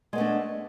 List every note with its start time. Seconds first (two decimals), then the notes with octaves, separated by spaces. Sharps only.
0.13 G#3
0.15 B3
0.18 A3
0.20 D4